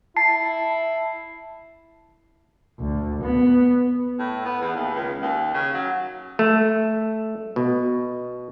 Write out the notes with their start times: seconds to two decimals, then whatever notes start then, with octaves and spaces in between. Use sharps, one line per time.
0.17 E4 A5 C7
2.80 D2
3.22 B3
4.19 A2
4.45 B3
4.61 E2
4.76 D#2
4.94 C#2
5.22 D#2
5.54 C#3
5.74 F#3
6.39 A3
7.56 B2